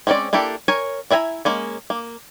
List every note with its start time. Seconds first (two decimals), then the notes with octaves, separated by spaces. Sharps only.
0.07 G#3 C4 C#4 F#4 D5
0.33 A#3 D4 E4 G4 A4
0.68 A#4 C#5 G#5
1.10 D4 E4 E5 G#5 A#5
1.45 G#3 A#3 C#4
1.90 A#3